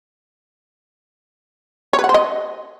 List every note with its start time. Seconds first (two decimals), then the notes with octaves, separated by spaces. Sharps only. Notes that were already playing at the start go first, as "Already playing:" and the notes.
1.93 C#5
1.99 B4
2.04 F#5
2.09 C5
2.14 D#5